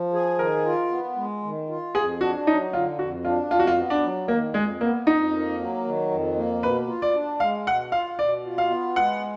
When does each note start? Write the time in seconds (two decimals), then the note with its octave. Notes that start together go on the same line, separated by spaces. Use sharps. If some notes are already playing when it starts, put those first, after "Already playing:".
Already playing: F3
0.13 G#4
0.38 D#3 A#4
0.65 F4
0.91 B3
1.16 G#3
1.43 D#3
1.69 F4
1.95 F2 G#4
2.21 D4 F#4
2.46 F#3 D#4
2.73 D3 F4
2.99 F2 F#4
3.25 D4 F4
3.51 F2 F4
3.59 F#4
3.67 F4
3.77 B3
3.90 D4
4.02 F#3
4.28 D#3 A#3
4.54 F2 G#3
4.80 A#3 B3
5.07 F2 D#4
5.33 A#3
5.59 F#3
5.85 D#3
6.11 F2
6.36 A#3
6.63 B2 B4
6.88 F4
7.02 D5
7.15 D4
7.40 G#3 F5
7.67 B2 F#5
7.92 F4 F5
8.19 B2 D5
8.45 F4
8.58 F5
8.70 B3
8.96 G#3 F#5